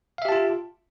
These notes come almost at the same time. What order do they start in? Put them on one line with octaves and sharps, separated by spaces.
F5 E5 G4 A5 F4